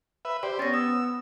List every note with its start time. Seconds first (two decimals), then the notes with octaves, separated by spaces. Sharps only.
0.25 B4 E5
0.43 G4 C5 D5
0.59 B3 C#4 A6 A#6
0.74 D#6 E6